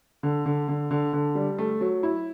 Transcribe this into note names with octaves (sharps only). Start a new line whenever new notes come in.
D3
D3
D3
D3
D3
G3
A3
F#3
E4